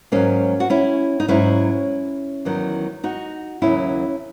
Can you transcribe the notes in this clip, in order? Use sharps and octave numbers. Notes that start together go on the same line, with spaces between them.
G#2 F#3 A#3 C#4
F#4
C#4 E4
D#4
G#2 F#3 C#4 E4
E2 D#3 F#3
D#4 F#4
D#2 C#3 F#3 C#4 E4